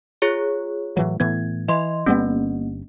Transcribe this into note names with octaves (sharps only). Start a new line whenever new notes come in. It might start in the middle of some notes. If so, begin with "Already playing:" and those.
F4 G#4 C#5
A2 E3 F#3
A2 E3 B3 G#6
E3 D#5 C6
G1 G3 A#3 B3 C#4